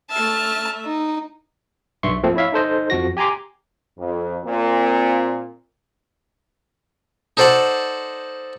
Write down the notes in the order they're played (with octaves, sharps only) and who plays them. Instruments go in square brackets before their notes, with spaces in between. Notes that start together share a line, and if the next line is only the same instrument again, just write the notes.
[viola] A3 E5 [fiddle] A5 F6
[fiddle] D#4
[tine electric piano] B1 G2 E5 C6 C#6
F3 A3 A#3 C4
E4 C#5 E5 F5
D#4 A4 C5 D#5
F2 F3 F#4 A#6
G4 G#5 A#5 C6 D6
[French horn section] F2
A#2 C4
[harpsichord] D#4 A4 C5 D5 F#5 A5